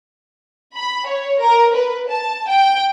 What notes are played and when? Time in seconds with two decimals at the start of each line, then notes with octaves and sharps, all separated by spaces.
0.75 B5
1.07 C#5
1.41 A#4
1.76 B4
2.09 A5
2.48 G5